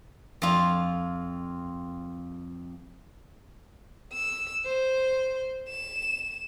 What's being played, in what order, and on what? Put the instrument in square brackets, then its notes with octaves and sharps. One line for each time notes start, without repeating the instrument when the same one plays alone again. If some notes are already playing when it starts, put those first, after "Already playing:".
[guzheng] F2 F4
[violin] E6
C5
E7